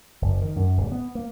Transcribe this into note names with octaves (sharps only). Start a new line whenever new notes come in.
F#1
D#3
F#2
D1
B3
A#3